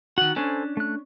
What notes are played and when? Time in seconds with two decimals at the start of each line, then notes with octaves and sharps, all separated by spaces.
0.18 D#3 F#4 F#5
0.36 C#4 D4 A4 C5 G#5
0.77 A3 F#6